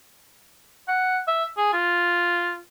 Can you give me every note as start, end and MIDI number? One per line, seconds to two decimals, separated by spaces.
0.88 1.20 78
1.28 1.45 76
1.57 1.73 68
1.73 2.58 65